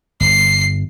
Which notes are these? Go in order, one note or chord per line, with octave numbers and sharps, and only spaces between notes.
G1 C7